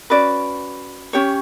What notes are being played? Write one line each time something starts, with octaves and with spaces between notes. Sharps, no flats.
C#4 F#4 B4 D5
C#4 G4 C#5